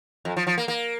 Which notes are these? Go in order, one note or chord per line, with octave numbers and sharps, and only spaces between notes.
F2
F3
F3
A#3
A#3